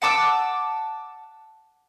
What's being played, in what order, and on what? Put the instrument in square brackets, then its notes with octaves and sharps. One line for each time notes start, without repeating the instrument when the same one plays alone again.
[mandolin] F#5 A5 D6 E6